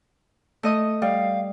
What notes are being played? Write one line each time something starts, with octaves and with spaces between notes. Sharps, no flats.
A3 D#5 D#6
G3 F5